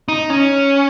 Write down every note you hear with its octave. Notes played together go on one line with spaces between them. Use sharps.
D#4
C#4